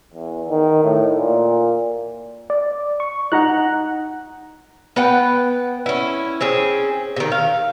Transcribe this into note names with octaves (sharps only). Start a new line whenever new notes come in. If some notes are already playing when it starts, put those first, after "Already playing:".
E2
D#3
A2
A#2
D5
C#6
D#4 F#5 A#5 F#6
B3 B4 F#5 G5
C#4 E4
C4 C#4 G#4
C3 D#3
F5